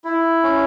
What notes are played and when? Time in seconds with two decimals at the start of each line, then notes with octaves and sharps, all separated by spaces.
0.04 E4
0.43 C#4